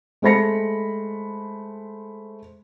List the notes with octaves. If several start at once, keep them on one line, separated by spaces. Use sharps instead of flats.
G#3 A3 C5 B5 A#6 C#7